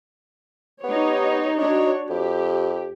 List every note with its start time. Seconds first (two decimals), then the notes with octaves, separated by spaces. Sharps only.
0.84 B3 D#4 G4 C#5
1.59 D4 D#4 F#4 C#5
2.10 F2 G4